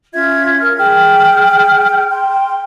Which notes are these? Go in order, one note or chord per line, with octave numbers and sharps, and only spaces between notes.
C#4 F4 E5 G#6
A#4 F6
G#4 G5 F6
G5 C6